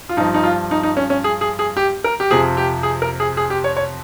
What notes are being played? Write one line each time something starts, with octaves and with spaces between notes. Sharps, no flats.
F4
G2 F3 D#4
D#4
F4
D#4
D#4
C#4
C#4
G#4
G#4
G#4
G4
A#4
G4
F2 C3 F3 G#4
G4
G#4
A#4
G#4
G#4
G4
C#5
C#5